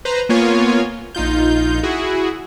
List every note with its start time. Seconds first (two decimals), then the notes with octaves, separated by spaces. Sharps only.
0.05 B4 C5 A#5
0.29 A#3 B3 F4 C#5 G#5
1.15 A#1 D#4 F4 G6
1.83 E4 F#4 G#4